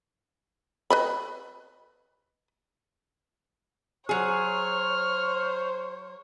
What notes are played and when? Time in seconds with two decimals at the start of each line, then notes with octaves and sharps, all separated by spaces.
0.90 B4 D#5 B5
4.09 F#3 G#4 C5 C#5 F6